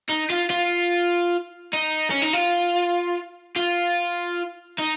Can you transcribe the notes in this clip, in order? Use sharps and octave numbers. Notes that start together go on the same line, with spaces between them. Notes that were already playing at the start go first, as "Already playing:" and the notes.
D#4
F4
F4
D#4
C#4
D#4
F4
F4
D#4